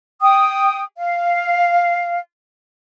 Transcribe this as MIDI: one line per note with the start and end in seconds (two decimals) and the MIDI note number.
0.21 0.82 79
0.21 0.82 87
0.98 2.18 77